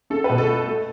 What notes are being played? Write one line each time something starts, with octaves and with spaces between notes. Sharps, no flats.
C#4 A4
B4
B2
A4
A3
A3